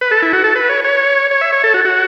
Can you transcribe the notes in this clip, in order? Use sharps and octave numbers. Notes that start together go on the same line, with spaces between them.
B4
A4
E4
F#4
A4
B4
C#5
C#5
C#5
E5
C#5
A4
F#4
F#4